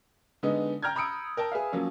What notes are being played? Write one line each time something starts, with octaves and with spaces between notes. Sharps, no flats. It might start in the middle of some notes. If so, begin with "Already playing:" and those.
D3 G#3 B3 D#4
G5 A#5 F6 G6 G#6
A#5 B5 D#6 E6 C#7 D7
A#4 G5 A5
G#4 B4 E5 F5
F3 F#3 A#3 C#4